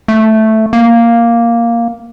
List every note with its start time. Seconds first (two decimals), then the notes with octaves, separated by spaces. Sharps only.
0.08 A3
0.73 A#3